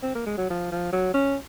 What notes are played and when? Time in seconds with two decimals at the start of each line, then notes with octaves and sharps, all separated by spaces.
0.03 C4
0.15 A#3
0.26 G#3
0.38 F#3
0.50 F3
0.72 F3
0.93 F#3
1.14 C#4